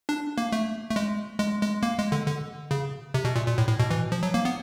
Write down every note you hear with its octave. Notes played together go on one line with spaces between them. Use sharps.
D4
A#3
A3
A3
G#3
G#3
G#3
A#3
G#3
D3
D3
C#3
C3
B2
A#2
A#2
A2
A2
B2
E3
F3
F#3
A#3
B3